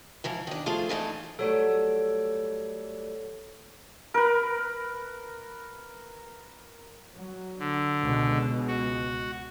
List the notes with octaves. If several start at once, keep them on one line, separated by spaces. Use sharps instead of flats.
G#2 E3 F3
D#3 D4
F3 A3 F4 G#4 A4
G2 E3 A3 D#4
F#3 G3 A3 A4 C#5 D7
A#4 B4
F#3
D3
C#2 B2 G#3
F#4